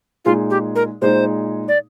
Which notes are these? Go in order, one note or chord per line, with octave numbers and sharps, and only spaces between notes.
A#2 G#3 D#4 F4 G#4
G4
A#4
A#2 G#3 D#4 G#4 C5
D5